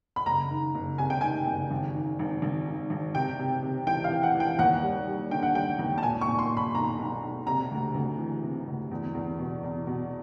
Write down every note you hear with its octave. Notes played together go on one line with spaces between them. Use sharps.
B5
F#1 A#5
D#3
F#1
C3 G#5
G5
D#3 G#5
F#1
G#1
D#3
G#1
G#1
G#2
G#1
C3 G5
C3
C3
E3 G5
F5
E3
F#5
E3
G5
D#2 F#5
G3
G3
D3 G5
F#5
G3 G5
D#2
A5
A#2 G#5
C#6
A#2
C6
A#2
B5
B1 A#5
B1
B1
C3 A#5
D2
D2
E3
C3
D2
E2
E2
B2
E2
B2